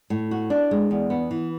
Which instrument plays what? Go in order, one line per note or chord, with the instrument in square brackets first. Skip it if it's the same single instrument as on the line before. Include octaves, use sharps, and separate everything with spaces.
[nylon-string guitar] A2
F#4
D4
G#3
E2
B3
E3